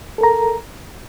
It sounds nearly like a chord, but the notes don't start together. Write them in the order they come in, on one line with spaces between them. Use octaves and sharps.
A4 A#4 A#5